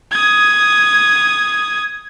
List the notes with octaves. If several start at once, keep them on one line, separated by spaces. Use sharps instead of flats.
D#6 G#6